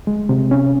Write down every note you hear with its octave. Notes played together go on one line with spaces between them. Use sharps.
G#3
C3
C#4